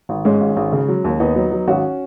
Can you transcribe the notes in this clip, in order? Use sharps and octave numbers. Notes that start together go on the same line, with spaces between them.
G#1
G#2 G#3 C#4
G#1
G#1
C#3
F#3
D#2
D#2 B3 D#4
F#3
F#3
G#1 C#4 F#4